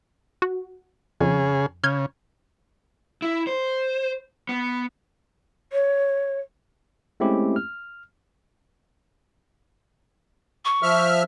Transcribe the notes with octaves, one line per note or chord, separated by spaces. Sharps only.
F#4
F2 C#3 G#4
C#3 F6 G6 G#6
E4
C5
B3
C#5
G#3 A3 C4 C#4 E4 G4
F6
C#6
F3 E5 F6